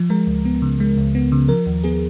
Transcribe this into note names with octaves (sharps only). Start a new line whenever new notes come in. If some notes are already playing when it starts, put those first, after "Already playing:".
Already playing: F3
G#3 A#4
C#2
B3
C#3
G#3
C#2
B3
C#3
F3 A#4
D#2
B3 G#4